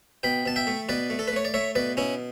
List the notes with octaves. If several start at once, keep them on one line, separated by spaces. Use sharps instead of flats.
B2 G5 B5
B2 A5
E5 G5
A3
B2 B4 D5
A3
A4
B4
A3 C#5
D5
A3 C#5 E5
B2 B4 D5
B2 C#4 E4